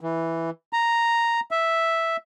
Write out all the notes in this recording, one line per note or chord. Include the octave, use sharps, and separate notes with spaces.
E3
A#5
E5